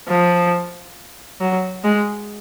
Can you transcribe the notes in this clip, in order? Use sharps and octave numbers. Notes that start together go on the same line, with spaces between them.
F3
F#3
G#3